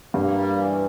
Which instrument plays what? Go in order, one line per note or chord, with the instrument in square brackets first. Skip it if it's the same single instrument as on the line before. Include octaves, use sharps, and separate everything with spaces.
[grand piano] G2 [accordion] A#3
[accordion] G3
E3